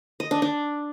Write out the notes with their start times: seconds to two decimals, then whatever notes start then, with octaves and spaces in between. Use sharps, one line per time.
0.20 D#5
0.31 D4
0.42 D4